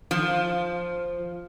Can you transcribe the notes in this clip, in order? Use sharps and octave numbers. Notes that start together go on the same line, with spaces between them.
F3